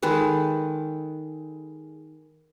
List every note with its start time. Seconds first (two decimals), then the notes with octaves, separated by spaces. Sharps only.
0.02 D#3 G#3 A4 B4